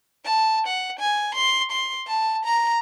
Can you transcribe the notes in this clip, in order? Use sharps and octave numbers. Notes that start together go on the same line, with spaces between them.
A5
F#5
G#5
C6
C6
A5
A#5